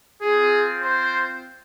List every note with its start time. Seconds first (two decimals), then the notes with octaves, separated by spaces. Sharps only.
0.21 C4 F4 G#4
0.81 C5